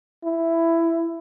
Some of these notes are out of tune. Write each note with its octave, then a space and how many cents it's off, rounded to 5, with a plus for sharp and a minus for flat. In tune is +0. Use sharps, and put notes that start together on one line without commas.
E4 +10